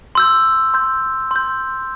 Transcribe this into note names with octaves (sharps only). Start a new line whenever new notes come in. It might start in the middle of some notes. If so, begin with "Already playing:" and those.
C6 E6 G6
C6 G6
C6 G6